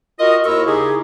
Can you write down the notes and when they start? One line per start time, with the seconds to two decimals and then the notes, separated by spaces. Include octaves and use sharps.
0.19 F4 F#4 A#4 D#5
0.44 D#2 E4 F4 A#4 C#6 E6
0.66 C#3 D#4 E4 G4 G#4